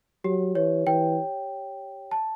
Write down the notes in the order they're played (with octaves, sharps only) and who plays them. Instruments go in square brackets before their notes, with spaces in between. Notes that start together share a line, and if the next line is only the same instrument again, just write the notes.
[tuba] F#3 [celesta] G4
[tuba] E3 [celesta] C#5
[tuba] E3 [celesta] G5
[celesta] A5